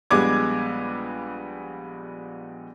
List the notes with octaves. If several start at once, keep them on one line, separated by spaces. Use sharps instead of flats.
A#1 G3 G#3 B3 D6 G#6